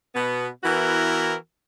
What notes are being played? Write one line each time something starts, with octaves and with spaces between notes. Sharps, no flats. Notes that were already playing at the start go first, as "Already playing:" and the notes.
B2 B3
E3 B3 E4 F#4 A#4